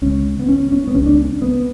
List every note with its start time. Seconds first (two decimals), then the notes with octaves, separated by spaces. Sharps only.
0.02 C#2 C#3 C#4
0.39 B3
0.48 C#4
0.72 C#4
0.87 B3
0.95 C#2 C#3 C#4
1.06 D4
1.42 B3